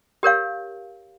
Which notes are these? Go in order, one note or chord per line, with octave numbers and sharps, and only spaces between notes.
G4 A#4 C#5 F5